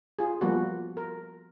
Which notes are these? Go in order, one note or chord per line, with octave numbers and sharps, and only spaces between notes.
F4 G#4
F3 G3 A#3 B3 F#4
A#4